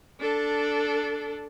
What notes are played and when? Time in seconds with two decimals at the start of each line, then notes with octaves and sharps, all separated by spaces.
0.20 D4 A4